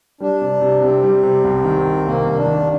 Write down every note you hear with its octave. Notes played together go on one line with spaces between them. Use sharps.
G3 D4
C3
C3
C3 C4
G3
C3
C2
D#3
D#3
C2 A#3
C2
D4
D#3